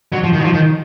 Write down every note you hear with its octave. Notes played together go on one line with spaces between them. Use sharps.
F#3
F3
D#3
F#3
F3
D#3